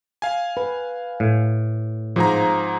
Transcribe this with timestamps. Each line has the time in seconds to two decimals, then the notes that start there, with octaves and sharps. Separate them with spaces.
0.22 F5 G#5
0.57 B4
1.20 A2
2.16 G#2 F3 F4 G#4 C5 A#5